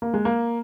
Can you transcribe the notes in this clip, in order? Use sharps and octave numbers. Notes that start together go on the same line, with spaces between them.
A#3
G#3
A#3